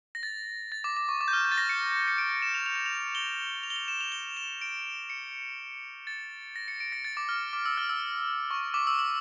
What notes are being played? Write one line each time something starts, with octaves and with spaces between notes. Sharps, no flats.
A#6
A6
A6
D6
D6
C#6
D6
G6
F6
G6
A6
A#6
C#7
C#7
D7
E7
F7
F7
E7
F7
G7
F7
G7
F7
E7
F7
G7
E7
D7
C#7
A6
A#6
C#7
D7
A#6
A6
D6
F6
D6
E6
F6
E6
C#6
D6
E6
E6